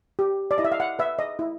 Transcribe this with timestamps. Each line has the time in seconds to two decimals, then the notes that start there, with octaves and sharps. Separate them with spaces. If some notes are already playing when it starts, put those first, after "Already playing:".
0.19 G4
0.51 D5
0.58 E4 D#5
0.65 E5
0.72 F5
0.80 F#5
0.99 B4 E5
1.19 D#5
1.39 E4